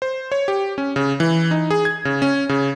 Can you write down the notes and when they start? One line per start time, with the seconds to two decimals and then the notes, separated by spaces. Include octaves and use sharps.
0.02 C5
0.32 C#5
0.48 G4
0.78 C#4
0.96 C#3
1.20 E3
1.51 D#4
1.70 G#4
1.85 G#6
2.05 C#3
2.22 C#4
2.49 C#3